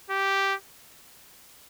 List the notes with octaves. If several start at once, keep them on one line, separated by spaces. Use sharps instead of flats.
G4